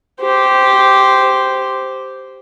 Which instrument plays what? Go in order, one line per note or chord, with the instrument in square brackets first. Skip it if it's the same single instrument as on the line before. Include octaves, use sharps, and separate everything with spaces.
[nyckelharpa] G4 C5